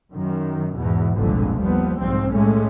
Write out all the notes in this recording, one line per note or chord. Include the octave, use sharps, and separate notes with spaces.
F#2 D#3
E2 G#2 B2
G1 C2 F2 A#2 D3 G#3
D#2 F3 G3 B3
B1 G#2 F3 C4
A2 G#3 A3 C#4